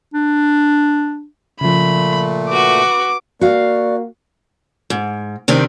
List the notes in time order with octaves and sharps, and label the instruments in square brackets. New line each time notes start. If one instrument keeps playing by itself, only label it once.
[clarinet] D4
[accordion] A#2 A3 [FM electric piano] C#3 F3 [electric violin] B5
[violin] F#4 B4 [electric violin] D6
[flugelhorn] A#3 [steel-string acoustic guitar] F#4 F5 [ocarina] D5
[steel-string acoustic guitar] G#2
C3 D#3 C4 D4